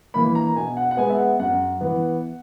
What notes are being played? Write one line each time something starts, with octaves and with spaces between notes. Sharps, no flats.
E3 A#3 B5
A#5
B2 G#5
F#5
F#5
G#3 B3 G#5
E5
F#5
F#2 F#5
E3 B3